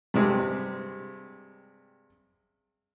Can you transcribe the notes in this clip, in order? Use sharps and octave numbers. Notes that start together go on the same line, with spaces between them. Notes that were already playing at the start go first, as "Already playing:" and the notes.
G2 C3 G#3